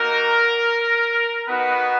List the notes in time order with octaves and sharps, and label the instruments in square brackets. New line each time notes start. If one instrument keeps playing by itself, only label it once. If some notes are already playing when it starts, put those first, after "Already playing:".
Already playing: [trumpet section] A#3 D#4 F#4 A#4
B3 D#4 F#4 B4